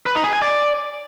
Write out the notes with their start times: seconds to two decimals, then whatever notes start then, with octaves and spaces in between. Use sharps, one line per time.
0.06 B4
0.15 D#4
0.24 G#4
0.33 G#5
0.42 D5